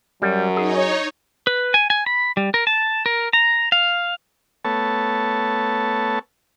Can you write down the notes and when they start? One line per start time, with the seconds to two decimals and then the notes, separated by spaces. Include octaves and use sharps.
0.22 F#2 F#3 G3
0.57 D#4 G#4 C#5
1.47 B4
1.74 G#5
1.90 G#5
2.06 B5
2.37 G3
2.54 A#4
2.67 A5
3.06 A#4
3.33 A#5
3.72 F5
4.64 A3 B3 C#5 A5